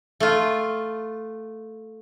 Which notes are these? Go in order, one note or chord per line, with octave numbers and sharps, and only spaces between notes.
A3 F4